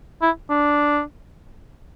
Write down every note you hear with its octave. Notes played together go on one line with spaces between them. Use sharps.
E4
D4